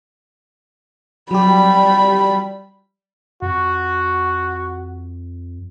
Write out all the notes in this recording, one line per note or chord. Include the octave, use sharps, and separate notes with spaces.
F#3 G3 G4 B5
F2 F#4